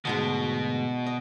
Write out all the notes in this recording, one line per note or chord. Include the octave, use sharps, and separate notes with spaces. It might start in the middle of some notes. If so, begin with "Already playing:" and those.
D2 G#2 B2 G#3
D#5